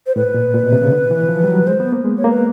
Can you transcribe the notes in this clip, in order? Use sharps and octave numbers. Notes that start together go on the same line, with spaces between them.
C5
A2 B4
A#2
A#2
B2
C3
C#3
D3
E3
F3
G3
F#3
G#3 C5
B3
A#3
G#3
C#5
A#3
B4